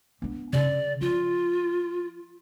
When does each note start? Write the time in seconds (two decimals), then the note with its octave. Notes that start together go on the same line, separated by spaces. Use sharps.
0.22 B3 D4
0.53 C#3 D5
1.01 F3 F4